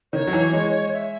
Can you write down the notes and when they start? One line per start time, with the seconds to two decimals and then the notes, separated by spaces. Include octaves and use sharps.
0.13 D#3 C#5
0.27 F#3
0.33 E3
0.53 G#3
0.93 E5